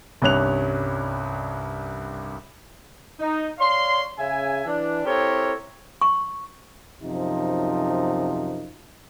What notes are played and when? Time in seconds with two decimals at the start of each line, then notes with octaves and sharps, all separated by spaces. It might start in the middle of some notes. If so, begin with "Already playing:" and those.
0.22 C2 G2 C#4 F#6 F7
3.19 D#4
3.58 C#5 D5 F5 C6
4.18 C#3 E5 G#5
4.65 E3 D4
5.04 C4 E4 G4 A4 A#4 C#5
6.01 C#6
7.03 F#2 C3 F3 D#4